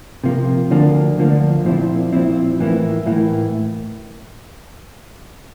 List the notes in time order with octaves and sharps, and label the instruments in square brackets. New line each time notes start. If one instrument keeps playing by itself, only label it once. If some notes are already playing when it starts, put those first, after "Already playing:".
[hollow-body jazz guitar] C3 F3 A#3
D2 D3 F3 A#3 D4
D2 D3 F3 A#3 D4
A#2 F3 C4 E4
A#2 F3 C4 E4
A2 E3 A#3 E4
A2 E3 A#3 E4